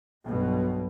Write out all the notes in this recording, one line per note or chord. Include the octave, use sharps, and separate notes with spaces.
B1 G2 B2